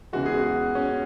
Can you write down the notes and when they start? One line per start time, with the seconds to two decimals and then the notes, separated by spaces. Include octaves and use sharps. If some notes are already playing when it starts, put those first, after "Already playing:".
0.13 E2 C#3 E3 G#3 F#4
0.26 G#4
0.40 F#4
0.75 C#4